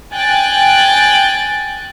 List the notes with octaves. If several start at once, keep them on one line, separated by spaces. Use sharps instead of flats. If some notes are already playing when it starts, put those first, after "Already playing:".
G5 G#5 F#6 A6